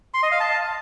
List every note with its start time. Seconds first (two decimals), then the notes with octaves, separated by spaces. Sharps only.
0.14 C6
0.23 D#5
0.31 F5
0.40 A5